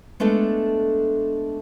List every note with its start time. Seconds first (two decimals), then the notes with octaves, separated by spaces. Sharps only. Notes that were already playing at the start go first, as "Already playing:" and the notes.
0.20 G#3 A3 B3 D4 A4